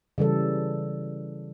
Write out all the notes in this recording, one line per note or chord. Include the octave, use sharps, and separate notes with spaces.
C#3 E3 G3 A4